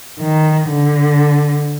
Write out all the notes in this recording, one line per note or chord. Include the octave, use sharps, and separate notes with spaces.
D#3
D3